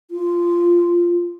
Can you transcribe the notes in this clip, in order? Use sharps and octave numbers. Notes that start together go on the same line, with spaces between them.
F4